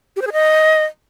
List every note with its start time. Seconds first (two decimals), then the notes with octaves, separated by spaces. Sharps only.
0.16 G4
0.22 C5
0.27 G#4
0.32 D#5